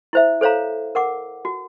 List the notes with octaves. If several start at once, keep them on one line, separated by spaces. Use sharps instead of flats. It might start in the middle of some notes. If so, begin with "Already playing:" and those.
E4 C5 E5
A4 C5 C#5 F5 A#5
A#4 F#5 D6
F#4